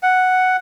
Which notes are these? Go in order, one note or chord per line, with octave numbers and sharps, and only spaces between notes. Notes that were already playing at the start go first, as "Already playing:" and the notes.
F#5